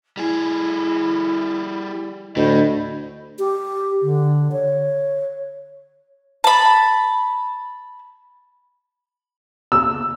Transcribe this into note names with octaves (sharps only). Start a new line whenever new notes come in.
G3 E4 G#4
D2 A2 D#5 B5 G6
G4
D3
C#5
A5 B5
E6